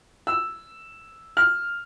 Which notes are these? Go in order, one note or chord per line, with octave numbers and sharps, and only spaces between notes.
E6
F6